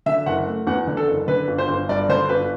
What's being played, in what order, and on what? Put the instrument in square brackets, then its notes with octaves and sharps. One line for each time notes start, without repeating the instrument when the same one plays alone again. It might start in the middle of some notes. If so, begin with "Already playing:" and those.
[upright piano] D3 E5
F#1 F#5
A3
E2 F#5
D3
A4
F#1
D3 B4
G1
C5
G1
G2 D5
D3 C5
G1 B4